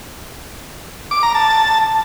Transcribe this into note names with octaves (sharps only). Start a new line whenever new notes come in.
D6
A#5
A5